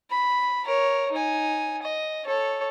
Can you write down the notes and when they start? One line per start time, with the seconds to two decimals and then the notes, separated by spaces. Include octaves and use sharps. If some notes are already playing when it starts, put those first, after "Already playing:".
0.11 B5
0.65 A#4 C#5
1.12 D#4 G#5
1.82 D#5
2.25 A4 C#5